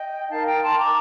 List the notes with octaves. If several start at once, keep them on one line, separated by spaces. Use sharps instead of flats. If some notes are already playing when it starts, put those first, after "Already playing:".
Already playing: D#5 G5
D#4 A#4 F5 A5
G5 A#5
A5 C6
A#5 D6